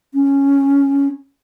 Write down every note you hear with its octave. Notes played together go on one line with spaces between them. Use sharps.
C#4